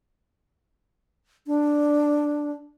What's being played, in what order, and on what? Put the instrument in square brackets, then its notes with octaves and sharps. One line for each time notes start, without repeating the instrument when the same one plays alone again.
[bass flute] D4